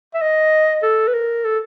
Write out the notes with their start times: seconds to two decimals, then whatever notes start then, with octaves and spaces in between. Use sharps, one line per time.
0.14 E5
0.22 D#5
0.83 A4
1.08 B4
1.14 A#4
1.45 A4